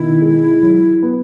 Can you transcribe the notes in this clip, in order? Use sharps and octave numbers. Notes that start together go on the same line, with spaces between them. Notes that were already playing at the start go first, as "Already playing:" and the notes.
Already playing: B2 D#3 E4
G#3
F#3
B3